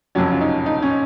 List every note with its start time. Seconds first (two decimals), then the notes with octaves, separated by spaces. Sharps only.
0.15 F#1 F2 C3 F#3 C#4
0.32 C#4 F4
0.41 D#4
0.66 D#4
0.82 C#4